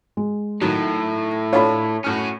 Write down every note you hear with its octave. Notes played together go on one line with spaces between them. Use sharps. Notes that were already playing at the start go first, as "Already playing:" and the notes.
G#3
A2 D#3 F#3 D#4
A3 D4 F4 C#5 B5
A2 C#4 F#4 F6